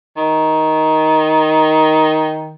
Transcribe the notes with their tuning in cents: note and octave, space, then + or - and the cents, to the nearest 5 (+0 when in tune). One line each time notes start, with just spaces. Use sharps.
D#3 +10